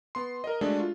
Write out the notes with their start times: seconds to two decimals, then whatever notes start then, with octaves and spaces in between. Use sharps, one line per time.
0.15 B3 C6
0.44 A#4 D#5
0.61 G#3 A3 D4 F#4 G#4 A4
0.80 F4